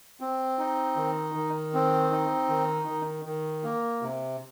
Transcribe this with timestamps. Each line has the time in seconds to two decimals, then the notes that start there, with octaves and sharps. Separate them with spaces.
0.21 C4
0.59 D#4
0.96 D#3
1.34 D#3
1.74 C4
2.11 D#4
2.49 D#3
2.88 D#3
3.25 D#3
3.64 A#3
4.02 C3